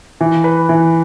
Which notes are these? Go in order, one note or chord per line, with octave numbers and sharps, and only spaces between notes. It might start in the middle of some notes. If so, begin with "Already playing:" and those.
E3
B4
E3